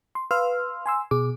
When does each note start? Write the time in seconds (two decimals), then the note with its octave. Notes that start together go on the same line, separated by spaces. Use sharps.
0.15 C6
0.31 B4 F5 C6 E6 F6
0.86 G#5 C6 E6
1.11 B2 G#4 D6